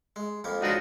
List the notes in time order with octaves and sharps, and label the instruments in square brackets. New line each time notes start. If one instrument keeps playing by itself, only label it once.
[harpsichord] G#3
F2 A#3 B3
[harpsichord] C#2 F3 [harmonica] D4 D#4 F#4